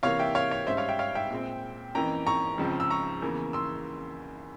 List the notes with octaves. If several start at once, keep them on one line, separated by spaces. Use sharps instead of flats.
C3 E3 A#3 C#5 F5
E5 G5
C#5 F5
C#5
G#2 G3 C#4 C5 E5
C#5 F5
E5 G5
C#5 F5
E5 G5
A#2 G#3 C4
F2 E3 A#3 C#4 G5 A#5
A#5 C#6
C#2 C#3 F3 C4
E6
A#5 C#6
E2 C#3 E3 A#3
C6 E6